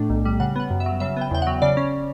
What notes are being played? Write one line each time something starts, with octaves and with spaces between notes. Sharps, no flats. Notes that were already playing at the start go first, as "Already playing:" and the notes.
Already playing: A2 A3 D4
B1
G3
C#3 F#5
B3 F#5
F#2
E5
F#3
C#3 E5
B3 G5
E2 G5
F#3 F#5
C#3 D5
C#4